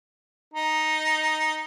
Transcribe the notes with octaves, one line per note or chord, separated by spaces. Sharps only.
D#4